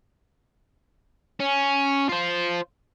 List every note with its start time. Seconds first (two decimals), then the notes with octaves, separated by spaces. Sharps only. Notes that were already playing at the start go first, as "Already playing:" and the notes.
1.40 C#4
2.09 F4 C5